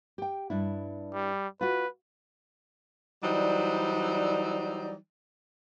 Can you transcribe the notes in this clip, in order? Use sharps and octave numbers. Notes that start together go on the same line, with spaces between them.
G4 G5
G2 D4 E4
G3
F4 F#4 B4
E3 F#3 G3 D#4 C5 D5